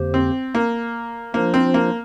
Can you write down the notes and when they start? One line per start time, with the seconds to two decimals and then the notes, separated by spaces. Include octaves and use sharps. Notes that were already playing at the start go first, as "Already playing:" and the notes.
Already playing: F2 D3 A#3 G4 C5
0.14 C4
0.55 A#3
1.34 F3 A#3 D4 F4 C5
1.54 C4
1.74 A#3